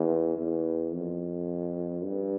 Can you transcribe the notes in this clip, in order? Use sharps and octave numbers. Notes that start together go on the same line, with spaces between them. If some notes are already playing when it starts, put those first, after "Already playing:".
Already playing: E2
E2
F2
G2